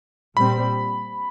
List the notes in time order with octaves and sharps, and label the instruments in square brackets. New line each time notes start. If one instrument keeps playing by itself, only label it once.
[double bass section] A#2 G3 C4 [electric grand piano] B5